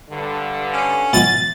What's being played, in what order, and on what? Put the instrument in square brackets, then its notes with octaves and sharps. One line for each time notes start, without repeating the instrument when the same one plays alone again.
[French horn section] G2 D3
[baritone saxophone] C#4
[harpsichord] B2 E3 F#3 [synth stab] A6